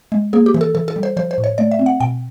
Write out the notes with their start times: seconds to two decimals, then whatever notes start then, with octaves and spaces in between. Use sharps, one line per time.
0.12 G#3
0.33 A#3 G#4
0.46 G4
0.54 E3
0.61 A4
0.75 E3 A4
0.88 A4
0.96 G3
1.03 C5
1.17 F3 C5
1.31 C5
1.38 A2
1.44 C#5
1.58 A3 D5
1.71 E5
1.79 C4
1.86 F#5
2.00 B2 G5